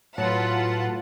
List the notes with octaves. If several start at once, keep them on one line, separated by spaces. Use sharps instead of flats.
A2 F#3 F4 B4 F#5 A5